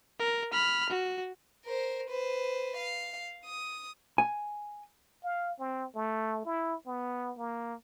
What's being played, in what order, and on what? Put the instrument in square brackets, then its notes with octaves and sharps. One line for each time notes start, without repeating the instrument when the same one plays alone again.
[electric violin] A#4
B5 F6
F#4
[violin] A#4 C5
B4 C5
F5
D#6
[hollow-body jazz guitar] G#5
[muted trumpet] F5
C4
A3
E4
B3
A#3